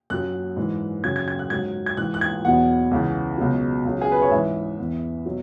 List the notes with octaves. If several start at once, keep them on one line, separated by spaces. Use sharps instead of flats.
F#2 F#3 F#6
G#2 E3
F#2 C#3 F#3 G#6
G#6
G#6
F#6
G#2 F#3 G#6
G#6
G#2 E3 F#6
F#6
G#6
E2 B2 F#3 F#5
C#2 C#3 E3
C#2 B2 F#3
C#2 C#3 F#3
G#4
B4
C#5
G#2 E3 E5
E2 E3
B2 F#3